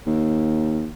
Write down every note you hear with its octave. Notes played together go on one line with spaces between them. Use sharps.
D#2